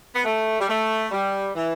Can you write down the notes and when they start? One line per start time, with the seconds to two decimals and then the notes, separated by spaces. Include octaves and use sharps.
0.16 B3
0.25 A3
0.61 G3
0.69 A3
1.12 G3
1.55 E3